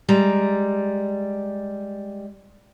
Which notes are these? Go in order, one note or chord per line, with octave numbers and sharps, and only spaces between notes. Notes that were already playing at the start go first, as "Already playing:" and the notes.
G3 G#3 A#5